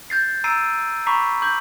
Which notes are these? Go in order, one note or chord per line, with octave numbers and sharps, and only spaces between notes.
G6 A6 C7
A#5 E6 A6 C7 D7 D#7
A#5 B5 C#6 D6 B6 C7
D6 G6 F#7